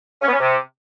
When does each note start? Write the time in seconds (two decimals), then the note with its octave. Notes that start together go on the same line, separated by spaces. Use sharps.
0.22 C#4
0.27 B3
0.33 C#4
0.38 C3